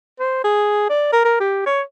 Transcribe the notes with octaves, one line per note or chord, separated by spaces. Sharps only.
C5
G#4
D5
A#4
A#4
G4
C#5